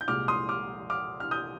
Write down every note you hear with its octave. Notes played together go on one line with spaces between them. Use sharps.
G6
C2 A#2 G#3 D6 F6
C6 D#6
D6 F6
D6 F6
F6
D#6 G6